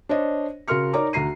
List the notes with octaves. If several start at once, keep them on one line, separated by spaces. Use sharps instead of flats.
D4 C5 C#5 D#5
C#3 F#4 A#4 C6 F6 C#7
D#4 A#4 C#5 D5 A#5 D6
D2 F#4 A#5 C7 D#7